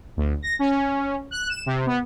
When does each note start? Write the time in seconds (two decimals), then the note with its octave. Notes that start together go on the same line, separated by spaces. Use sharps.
0.17 D2
0.42 A#6
0.59 C#4
1.31 F#6
1.50 E7
1.66 C3
1.86 B3